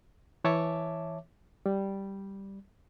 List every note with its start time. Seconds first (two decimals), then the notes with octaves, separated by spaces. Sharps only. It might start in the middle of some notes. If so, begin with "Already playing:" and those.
0.44 E3 C#5 E5 A5 D6
1.66 G3